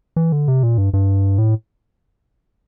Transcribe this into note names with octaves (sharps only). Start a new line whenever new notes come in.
E3
D3
C3
A#2
G2
G2
A2